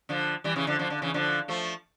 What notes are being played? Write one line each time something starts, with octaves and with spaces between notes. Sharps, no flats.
D3 F3
E3 G3
C#3 E3
D3 F3
D3 F3
D3
C#3 E3
D3 F3
F3 A3